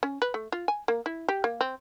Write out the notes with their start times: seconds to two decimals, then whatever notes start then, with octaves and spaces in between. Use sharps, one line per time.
0.03 C#4
0.22 B4
0.34 A3
0.52 F4
0.68 G#5
0.88 A#3
1.06 E4
1.29 G4
1.44 A#3
1.61 C4